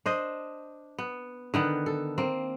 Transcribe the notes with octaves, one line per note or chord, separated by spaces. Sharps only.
D4 C5 D#5
B3
D3 D#3 B3
A4
A#3 C4